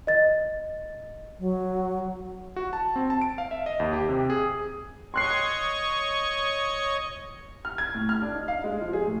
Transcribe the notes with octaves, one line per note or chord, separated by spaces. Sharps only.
D#5 A6
F#3
F#4
A5
C4
A5
D7
F5
E5
D#5
D#2
G4
C3
G#4
C#5 D#5 C6 C#6 F#6 C7
F6
G#6
A2
F6
D4
D#4
F5
G#3
F3
G#4
A2